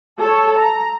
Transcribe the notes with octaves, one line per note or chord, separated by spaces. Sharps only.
A4 C#5
A#5